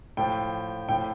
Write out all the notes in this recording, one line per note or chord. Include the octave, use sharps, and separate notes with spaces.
A2 F3 G5
A2 F3 G5